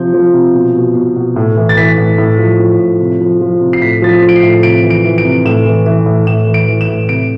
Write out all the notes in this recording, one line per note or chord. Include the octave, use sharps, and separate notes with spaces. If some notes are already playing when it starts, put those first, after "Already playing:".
Already playing: C3 F3 G6
F3
C3
B2
B2
B2
B2
A2
E3
A6
E3 B6
A2
A2
F3
F3
A2
C3
F3
F3
C3
C7
A2 B6
F3 A6
B6
F3
D7
C7
A2
C3 D7
E3
D7
E3
D7
C3
A2 E7
E3
E3
A2
A2 E7
E3
D7
E3
E7
A2
C3 D7